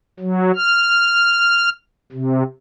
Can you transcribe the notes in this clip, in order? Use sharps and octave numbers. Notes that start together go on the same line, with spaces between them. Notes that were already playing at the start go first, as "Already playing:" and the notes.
F#3
F6
C3